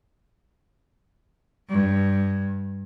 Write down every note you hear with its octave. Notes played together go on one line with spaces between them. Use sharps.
G2